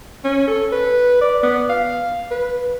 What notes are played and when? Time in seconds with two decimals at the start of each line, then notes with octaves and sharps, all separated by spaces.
0.24 C#4
0.48 A4
0.72 B4
1.21 D5
1.43 B3
1.69 F5
2.31 B4